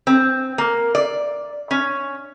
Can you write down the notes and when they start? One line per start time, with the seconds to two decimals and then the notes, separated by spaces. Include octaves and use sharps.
0.07 C4
0.58 A#3
0.95 D5
1.71 C#4